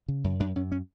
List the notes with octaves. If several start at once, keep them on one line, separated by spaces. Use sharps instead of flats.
C#3
F#2
F#2 D4
F#2 C#4
C#4